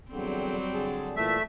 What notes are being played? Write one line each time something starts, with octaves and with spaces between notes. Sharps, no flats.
E2 D3 F#3 G3 C4
D3 G#4 A5
A#2 E3 A3 E5 A5